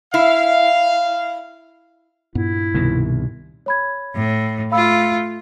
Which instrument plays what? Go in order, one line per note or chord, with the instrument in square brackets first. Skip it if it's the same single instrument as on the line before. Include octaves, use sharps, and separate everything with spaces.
[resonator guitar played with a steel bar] E4 [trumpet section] F5
[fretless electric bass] G2 A#2 B3 [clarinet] E4
[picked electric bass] C2 [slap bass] B2 D#3
[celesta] C#5 B5 G#6
[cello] A2
[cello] A3 F4 [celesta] F5 B5 E6